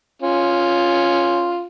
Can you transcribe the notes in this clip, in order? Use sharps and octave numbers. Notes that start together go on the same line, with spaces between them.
C#4 F4